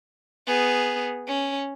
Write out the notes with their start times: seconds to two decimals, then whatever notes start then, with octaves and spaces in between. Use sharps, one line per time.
0.47 B3 G#4
1.28 C#4